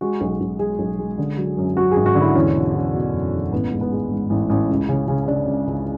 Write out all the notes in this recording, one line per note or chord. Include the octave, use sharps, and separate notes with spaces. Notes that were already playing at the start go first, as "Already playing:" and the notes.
G#3 F#4
B1
B1
G#3 G#4
B1
G#3
D3
F#3
F#2
F#3 F#4
G#1 G#4
F#4
D3
E4
E2 C#4
B2
E2
B2
F#1
E2
A1 B3
G#2
B3
G#3
G#2
A1
A1
C#2
C#3
C#3
C#3 D4
C#2
C#2